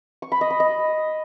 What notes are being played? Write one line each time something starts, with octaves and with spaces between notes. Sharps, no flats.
C#6
B5
D#5
B5
D#5